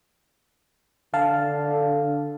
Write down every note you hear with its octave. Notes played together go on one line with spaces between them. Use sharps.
D3 F5 A5